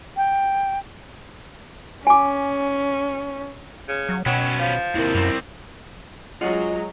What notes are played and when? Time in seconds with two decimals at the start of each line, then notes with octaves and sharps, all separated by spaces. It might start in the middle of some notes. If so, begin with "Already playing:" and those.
0.17 G5
2.07 C#4 G#5 D6
3.89 C#3
4.09 F#3
4.26 B2 F#3 B3 C#4 G5 E7
4.59 F3 F5
4.95 D#2 C3 E4 A#4
5.15 F#2 G3 C4
6.41 F#3 G#3 F4 G#4 D#5 F#5 A#5